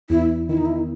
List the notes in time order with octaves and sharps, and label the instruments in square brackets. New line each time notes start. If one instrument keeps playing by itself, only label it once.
[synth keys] E2 [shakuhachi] E4
[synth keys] D#3 [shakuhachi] E4
[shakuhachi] D#4
E4